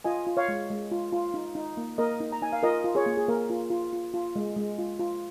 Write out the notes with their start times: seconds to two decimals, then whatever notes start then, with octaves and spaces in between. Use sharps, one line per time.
0.04 F4 D#5 G#5
0.27 F4
0.37 C#5 F5
0.48 G#3
0.70 G#3
0.92 F4
1.12 F4
1.34 D#4
1.55 D#4
1.77 A#3
1.98 A#3 A#4 D#5
2.20 D#4
2.32 A#5
2.42 D#4 G#5
2.53 F5
2.63 F4 A#4 D#5
2.84 F4
2.95 G#4 C#5
3.06 A#3
3.17 G#4
3.28 A#3 A#4
3.50 F4
3.70 F4
3.93 F4
4.14 F4
4.36 G#3
4.56 G#3
4.78 F4
4.99 F4